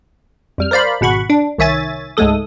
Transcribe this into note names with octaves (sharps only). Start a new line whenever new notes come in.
F2 G3 F6
A#4 C5 D5 F5 B5
G#1 B2 F#5 B5 C#6
D4
C2 D#3 C#5 E5 G#5 A6
C#2 G#2 G#3 A3 A4 D#6